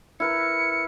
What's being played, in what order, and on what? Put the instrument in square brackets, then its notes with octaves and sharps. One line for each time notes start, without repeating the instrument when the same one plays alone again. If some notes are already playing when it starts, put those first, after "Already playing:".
[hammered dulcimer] E4 A#4 B4 [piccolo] C#7